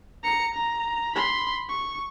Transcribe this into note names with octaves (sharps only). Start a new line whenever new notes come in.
A#5 C#7
A#5
B5 C6
C#6